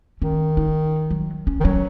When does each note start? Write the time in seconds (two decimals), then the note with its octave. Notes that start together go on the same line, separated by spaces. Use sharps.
0.22 D#3 C#4
0.57 D#4
1.11 F#3
1.47 C#4
1.60 D#3
1.65 F#3 C#4